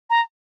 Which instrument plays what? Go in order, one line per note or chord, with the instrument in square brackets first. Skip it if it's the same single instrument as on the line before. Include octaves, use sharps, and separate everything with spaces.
[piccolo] A#5